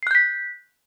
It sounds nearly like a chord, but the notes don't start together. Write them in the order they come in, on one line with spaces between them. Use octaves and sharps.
C7 F#6 G6 B6